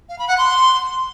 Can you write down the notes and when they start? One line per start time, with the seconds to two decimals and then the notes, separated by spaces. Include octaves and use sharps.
0.09 F5
0.19 B5
0.28 F#5
0.38 C6